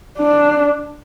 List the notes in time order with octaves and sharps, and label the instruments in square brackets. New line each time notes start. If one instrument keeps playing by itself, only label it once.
[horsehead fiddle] D4